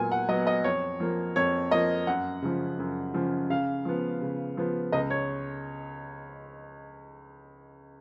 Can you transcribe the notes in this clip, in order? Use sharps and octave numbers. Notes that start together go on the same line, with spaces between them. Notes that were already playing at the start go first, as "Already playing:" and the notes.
Already playing: A#2 F#3 B3 G#5
F#5
F#3 B3 D#5
D#5
F2 C#5
F3 A#3
F2 C#5
F3 A#3 D#5
F#2 F#5
C#3 F3
F#2
C#3 F3
C#3 F5
F3 B3
C#3
F3 B3
C#2 D#5
C#5